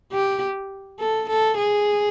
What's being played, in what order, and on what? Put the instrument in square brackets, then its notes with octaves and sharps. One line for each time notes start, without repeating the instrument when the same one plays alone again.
[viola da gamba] G4
A4
A4
G#4